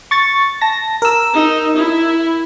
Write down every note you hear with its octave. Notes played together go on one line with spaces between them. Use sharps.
C#6 A6
A5 A#6
A#4 E6
D#4
E4